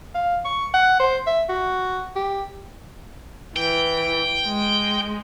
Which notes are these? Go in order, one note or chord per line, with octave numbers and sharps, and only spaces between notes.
F5
C#6
F#5
C5
E5
F#4
G4
E3 G5
G#3